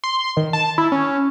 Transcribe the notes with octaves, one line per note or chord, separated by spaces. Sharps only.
C6
D#3
A5
E4
C#4